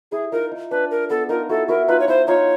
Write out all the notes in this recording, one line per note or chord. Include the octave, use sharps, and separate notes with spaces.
E4 G#4
D#4 F4 A#4
D#4
D4 B4
A#4
B3 A4
D#4 F4 A#4
E4 F#4 A4
E4 F#4 A#4
D#4 F4 B4
C#5
E4 C5
D#4 F4 C#5